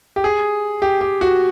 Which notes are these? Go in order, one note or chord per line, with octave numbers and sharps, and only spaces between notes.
G4
G#4
G4
G4
F#4